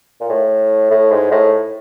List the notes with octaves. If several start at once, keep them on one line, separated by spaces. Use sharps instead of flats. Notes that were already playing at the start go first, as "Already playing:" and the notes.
A#2
A2
A2
G#2
A2